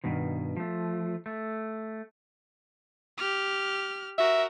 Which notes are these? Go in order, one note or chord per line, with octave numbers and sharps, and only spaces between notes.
G2 B2 D#3
F3 A3
A3
G4 F6
F#4 A#4 E5